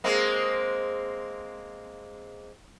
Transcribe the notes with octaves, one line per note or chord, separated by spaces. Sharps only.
G#3 A#3 C4